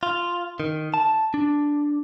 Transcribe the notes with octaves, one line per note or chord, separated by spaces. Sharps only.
F4
D#3
A5
D4